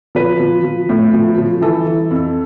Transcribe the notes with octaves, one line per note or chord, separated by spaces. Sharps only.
F3 B4
F3
F3
A2
F3
F3
E3 A4
E3
F2